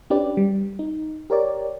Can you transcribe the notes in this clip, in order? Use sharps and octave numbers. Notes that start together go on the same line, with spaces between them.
C#4 D4 G4 B4 D5
G3
D#4
G4 A#4 C#5 D5